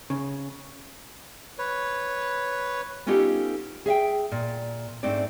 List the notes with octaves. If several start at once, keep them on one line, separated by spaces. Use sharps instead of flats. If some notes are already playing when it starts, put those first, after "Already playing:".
C#3
B4 C#5
B3 C#4 D#4 F4 G4 A4
G#4 E5 F5 G5
A#2
G#2 A3 C4 D4 D5